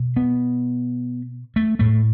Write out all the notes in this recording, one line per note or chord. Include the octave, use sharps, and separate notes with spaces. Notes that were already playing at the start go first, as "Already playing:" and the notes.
Already playing: B2
B3
A3
A2 A3